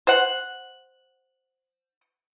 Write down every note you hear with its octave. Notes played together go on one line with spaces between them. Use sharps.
C5 F#5